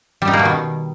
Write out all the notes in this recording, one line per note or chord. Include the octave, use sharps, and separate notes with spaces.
G3
D#4
A#3
B2
D#3